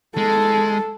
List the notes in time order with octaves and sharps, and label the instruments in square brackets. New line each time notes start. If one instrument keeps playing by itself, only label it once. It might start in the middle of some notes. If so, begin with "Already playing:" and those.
[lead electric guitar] G#3 [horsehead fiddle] A4